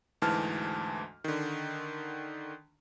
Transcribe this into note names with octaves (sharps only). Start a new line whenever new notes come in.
D2 G#2 E3 A5 F6
D3 D#3